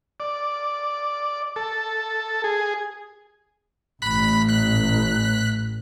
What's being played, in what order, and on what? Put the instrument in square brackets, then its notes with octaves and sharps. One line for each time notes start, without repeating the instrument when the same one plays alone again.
[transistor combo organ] D5
A4
G#4
[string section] A1 [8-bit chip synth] B5 F#6 B6
[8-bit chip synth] F#6 B6